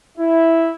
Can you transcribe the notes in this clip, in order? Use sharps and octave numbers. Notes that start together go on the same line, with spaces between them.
E4